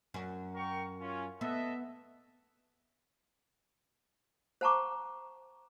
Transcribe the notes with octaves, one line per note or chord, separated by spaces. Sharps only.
F#2
A#4 G5 C#6
C#4 F4
B3 A4 D#5 E5
C5 F#5 A5 A#5 C#6 D6